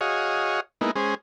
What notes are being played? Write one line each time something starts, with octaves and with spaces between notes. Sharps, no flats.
F#4 G#4 C#5 D#5 F5
G#3 A#3 B3 D#4 E4
G#3 C#4 G#4 C5